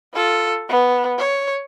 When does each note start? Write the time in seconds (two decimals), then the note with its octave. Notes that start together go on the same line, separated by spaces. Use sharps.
0.14 F4 A4
0.69 B3
1.18 C#5